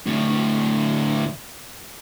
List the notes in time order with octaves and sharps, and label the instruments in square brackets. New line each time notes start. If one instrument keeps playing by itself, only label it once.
[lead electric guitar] D2 A2